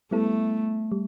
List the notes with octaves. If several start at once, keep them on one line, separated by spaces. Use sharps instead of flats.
G3 A3 B3 E4 A4
G3